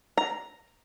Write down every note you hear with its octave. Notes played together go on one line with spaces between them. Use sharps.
A#5